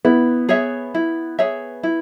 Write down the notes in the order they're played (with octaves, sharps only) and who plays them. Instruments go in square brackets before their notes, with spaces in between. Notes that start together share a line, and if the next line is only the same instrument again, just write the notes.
[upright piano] B3 [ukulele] E4
[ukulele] G#4 C#5 E5
E4
G#4 C#5 E5
E4